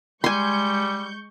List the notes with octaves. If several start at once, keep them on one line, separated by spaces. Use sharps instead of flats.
G3 G#3 G#5 C6 C#6 G6